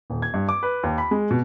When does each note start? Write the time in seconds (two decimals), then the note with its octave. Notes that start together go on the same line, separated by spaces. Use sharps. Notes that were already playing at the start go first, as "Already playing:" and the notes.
0.10 D#1
0.22 G#6
0.34 G2
0.49 D6
0.63 B4
0.83 D#2
0.98 B5
1.11 G#3
1.31 B2